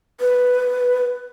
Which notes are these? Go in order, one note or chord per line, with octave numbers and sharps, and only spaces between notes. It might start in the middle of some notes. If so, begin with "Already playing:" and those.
B4